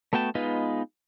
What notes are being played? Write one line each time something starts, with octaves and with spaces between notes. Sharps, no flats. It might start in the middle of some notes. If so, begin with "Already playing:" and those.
A3 B3 F#4 G5 A5
G#3 B3 D#4 F4 B4